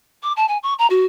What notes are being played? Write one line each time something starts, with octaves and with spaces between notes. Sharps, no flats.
D6
A5
G#5
C#6
A#5
F#4